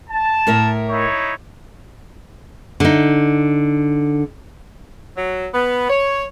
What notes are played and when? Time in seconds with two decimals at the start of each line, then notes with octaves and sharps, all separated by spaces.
0.10 A5
0.47 A2 A#4 E5
0.90 D#4 E4 C#5
2.80 D3 D#4
5.16 F#3
5.54 B3
5.90 C#5